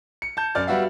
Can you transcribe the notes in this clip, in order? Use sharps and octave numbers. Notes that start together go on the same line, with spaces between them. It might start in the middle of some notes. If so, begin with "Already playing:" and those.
C#7
A5 G6
F#2 D5 F6 A6
G3 B3 F#4 E5 F5